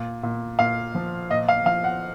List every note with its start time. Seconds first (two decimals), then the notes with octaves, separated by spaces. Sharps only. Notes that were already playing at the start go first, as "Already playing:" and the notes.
Already playing: A#2
0.23 A#2
0.59 A#2 F5
0.95 F3
1.30 A#2 D#5
1.48 F5
1.66 F3 F5
1.84 F#5